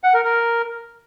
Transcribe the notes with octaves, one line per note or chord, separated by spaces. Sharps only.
F#5
A#4
A#4